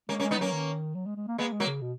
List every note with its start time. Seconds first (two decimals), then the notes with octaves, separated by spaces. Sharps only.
0.09 G#3 A#3 C#4
0.19 A#3 C#4
0.23 G#3
0.31 B3 D#4
0.37 F#3 A#3 C#4
0.52 D#3
0.95 F#3
1.06 G#3
1.16 G#3
1.28 A#3
1.38 G#3 A#3 B3
1.52 G#3
1.60 F#3 A#3
1.66 C#3
1.81 B2